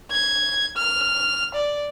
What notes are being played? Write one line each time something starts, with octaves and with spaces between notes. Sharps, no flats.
G#6
F6
D5